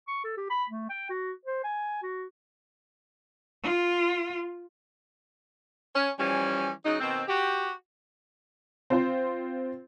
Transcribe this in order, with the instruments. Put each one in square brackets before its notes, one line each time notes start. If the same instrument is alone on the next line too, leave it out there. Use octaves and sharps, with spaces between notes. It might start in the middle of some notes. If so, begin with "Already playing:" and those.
[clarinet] C#6
A4
G4
B5
A3
G5
F#4
C5
G#5
F#4
[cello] F4
[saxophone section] C#4
E3 F3 G3 C#4
C#3 F#3 D#4
B2 D#3 C4
F#4 G4
[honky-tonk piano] C4 F4 C5